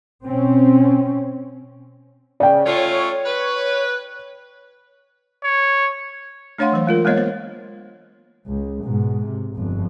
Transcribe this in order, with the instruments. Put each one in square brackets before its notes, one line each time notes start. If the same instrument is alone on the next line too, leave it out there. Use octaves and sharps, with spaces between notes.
[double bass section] B2 C4 C#4
[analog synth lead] C#3 [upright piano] D5 G5
[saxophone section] A3 C#4 F4 [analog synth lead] C#5
[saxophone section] B4
[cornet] C#5
[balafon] A3 D4 C#5 F5 F#5 C6
E3 F#3 C5
G#3 F4 A#4
G#3 A#3 B3 C#5 D#5
C5
[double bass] C#2
G#2 B2
C3
G1 F2